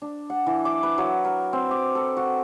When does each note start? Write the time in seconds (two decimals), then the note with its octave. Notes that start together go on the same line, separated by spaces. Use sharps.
0.02 D4
0.30 F#5
0.47 E3
0.65 D6
0.83 B4
0.98 F#3
1.25 A#4
1.53 C4
1.71 D6
1.95 A4
2.17 F#4